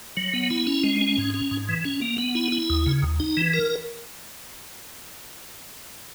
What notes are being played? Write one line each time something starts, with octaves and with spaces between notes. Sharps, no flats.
F#3
B3
E4
C#4
G#3
C#4
G#2
C#4
G#2
E3
C#4
A#3
B3
E4
E4
D#2
C#3
D#2
D#4
E3
A#4